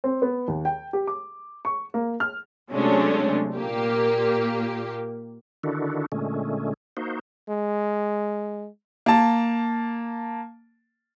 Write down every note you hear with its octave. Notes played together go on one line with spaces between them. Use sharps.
C4
B3
D#2
G5
G4
D6
C#6
A#3
F6
C3 F#3 G#3 A3 C#4 D4
A#2 A#3 G4
D3 D#3 D4 E4 F#4
A#2 D3 G#3 A3 C#4
A#3 D#4 F#4 C5
G#3
A#3 A5